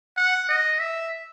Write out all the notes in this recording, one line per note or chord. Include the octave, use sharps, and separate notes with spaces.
F#5
D#5
E5